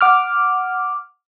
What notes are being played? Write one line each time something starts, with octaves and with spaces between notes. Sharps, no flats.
F#5 D6 F6